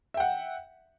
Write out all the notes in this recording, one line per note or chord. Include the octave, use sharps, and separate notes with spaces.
E5 F#5 G5